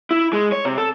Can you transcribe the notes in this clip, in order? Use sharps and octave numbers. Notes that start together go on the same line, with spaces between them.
E4
G#3
C#5
C3
A4